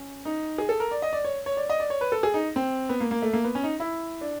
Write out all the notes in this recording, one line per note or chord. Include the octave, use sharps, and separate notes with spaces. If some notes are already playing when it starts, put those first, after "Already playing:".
Already playing: C#4
D#4
G#4
A4
A#4
D5
D#5
D5
C#5
C#5
D5
D#5
D5
C#5
B4
A4
G#4
D#4
C4
B3
A#3
A#3
A3
A#3
B3
C#4
D#4
E4
D4